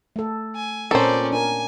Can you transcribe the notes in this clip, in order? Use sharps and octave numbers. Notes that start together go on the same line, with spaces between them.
A3 A4
G#5
A#2 C4 C#4 A4 A#4 C5 D5
D4 A#4 G#5